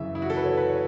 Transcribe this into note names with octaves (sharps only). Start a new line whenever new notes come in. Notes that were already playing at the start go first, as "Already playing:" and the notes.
Already playing: F#2 C#3 E3 E5
E4
F#4
A4
B4
C#5
B4
C#5